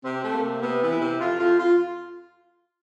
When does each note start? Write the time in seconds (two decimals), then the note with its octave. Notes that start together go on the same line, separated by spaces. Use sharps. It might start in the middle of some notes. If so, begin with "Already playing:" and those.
0.05 C3 C4
0.24 A3
0.34 A#3
0.43 C3
0.62 C3 B3
0.82 E3
0.91 E4
1.01 C3
1.20 F2 F4
1.39 F2 F4
1.59 F4